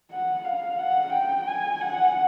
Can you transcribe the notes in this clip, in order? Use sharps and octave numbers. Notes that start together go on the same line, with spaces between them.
F#5
F5
F#5
G5
G#5
F#5